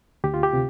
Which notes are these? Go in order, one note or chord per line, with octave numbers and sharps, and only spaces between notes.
D2 G4
F4
G4
C3